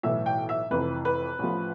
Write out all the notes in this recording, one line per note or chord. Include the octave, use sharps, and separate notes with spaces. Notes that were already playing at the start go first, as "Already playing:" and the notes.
B1 A2 E3 E5
G5
E5
F1 F2 E3 B4
B4
A1 A2 F3